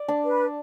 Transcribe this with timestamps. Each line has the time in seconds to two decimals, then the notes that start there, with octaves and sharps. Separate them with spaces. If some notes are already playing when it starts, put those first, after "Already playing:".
Already playing: D5
0.08 D4
0.24 B4